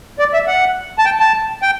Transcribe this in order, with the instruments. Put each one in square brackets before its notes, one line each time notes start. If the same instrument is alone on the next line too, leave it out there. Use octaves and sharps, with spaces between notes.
[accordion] D5
E5
F#5
A5
G5
A5
G5